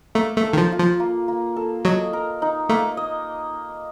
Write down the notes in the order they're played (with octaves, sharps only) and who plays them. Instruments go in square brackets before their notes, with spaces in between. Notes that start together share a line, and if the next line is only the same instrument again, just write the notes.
[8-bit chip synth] A3 [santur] A#3
[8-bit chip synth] A3
[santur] A4
[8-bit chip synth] D#3
F3
[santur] F4
[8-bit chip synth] F3
[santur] A#3
A#3
A4
[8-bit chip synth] F#3 [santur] D#5
[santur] A#4
D#4
[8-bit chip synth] A3 [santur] A#3
[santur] D#5